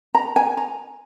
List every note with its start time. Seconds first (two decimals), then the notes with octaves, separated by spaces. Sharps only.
0.15 A#5
0.36 G#5
0.57 A#5